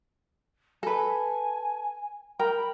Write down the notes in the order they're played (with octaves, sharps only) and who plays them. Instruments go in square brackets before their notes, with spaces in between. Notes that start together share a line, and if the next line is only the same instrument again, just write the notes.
[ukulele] A4 B4 [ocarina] G#5
[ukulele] A#4 G5 [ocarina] B5